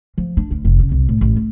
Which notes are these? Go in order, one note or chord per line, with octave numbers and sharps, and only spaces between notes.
F3
D4
D2
F1
C#3
C2
A2
A1
A3